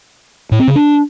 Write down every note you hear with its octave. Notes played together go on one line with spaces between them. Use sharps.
A2
C4
C#3
D4